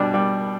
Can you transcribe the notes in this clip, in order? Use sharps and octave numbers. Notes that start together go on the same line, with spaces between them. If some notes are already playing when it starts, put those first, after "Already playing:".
Already playing: B2 G3 D4
G3